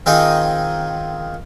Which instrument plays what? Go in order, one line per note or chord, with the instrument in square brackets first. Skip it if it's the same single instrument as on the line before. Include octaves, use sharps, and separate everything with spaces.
[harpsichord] D#3 C4 D#4 F4 G#4 D#5